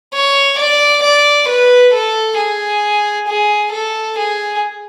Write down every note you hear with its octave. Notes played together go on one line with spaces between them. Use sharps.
C#5
D5
D5
B4
A4
G#4
G#4
A4
G#4